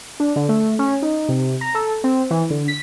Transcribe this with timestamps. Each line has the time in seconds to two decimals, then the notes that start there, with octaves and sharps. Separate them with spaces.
0.20 D4
0.36 D3
0.49 A3
0.79 C#4
1.02 D#4
1.29 C3
1.61 A#5
1.74 A4
2.04 C4
2.31 E3
2.50 D3
2.68 B6